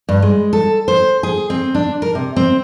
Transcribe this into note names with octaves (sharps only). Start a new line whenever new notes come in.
G2
G#3
A4
C5
G#4
C4
D4
A#4
C3
C4